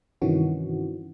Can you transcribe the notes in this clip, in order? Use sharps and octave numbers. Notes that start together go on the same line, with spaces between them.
G2 C3 D#3 E3 C#4 F#4